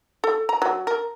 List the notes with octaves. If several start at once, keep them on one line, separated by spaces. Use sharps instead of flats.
A4
A#5
F#3
A#4